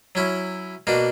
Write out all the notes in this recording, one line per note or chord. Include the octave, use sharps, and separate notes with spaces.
F#3 C#4 E4
B2 A#3 D4 F#4